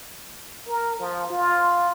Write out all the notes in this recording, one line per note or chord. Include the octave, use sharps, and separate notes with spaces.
A#4
F3
F4